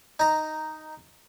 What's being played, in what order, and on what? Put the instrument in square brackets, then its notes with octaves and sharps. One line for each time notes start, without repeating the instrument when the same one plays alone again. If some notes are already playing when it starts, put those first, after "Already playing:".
[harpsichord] D#4 A#5